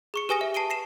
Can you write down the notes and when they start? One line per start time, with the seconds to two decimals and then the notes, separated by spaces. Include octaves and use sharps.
0.14 G#4 C#6 C#7
0.29 G4 B4 G#5 D#6 A#6 G7
0.41 E5
0.54 A5 C7 D7 D#7 G7
0.70 A#6 C7 E7